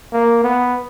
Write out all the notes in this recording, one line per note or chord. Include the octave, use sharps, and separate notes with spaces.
A#3
B3